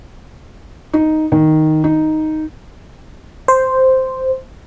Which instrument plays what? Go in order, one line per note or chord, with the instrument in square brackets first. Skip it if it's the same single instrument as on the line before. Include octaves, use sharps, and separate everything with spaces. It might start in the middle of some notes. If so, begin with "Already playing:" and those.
[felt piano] D#4
D#3
D#4
[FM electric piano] C5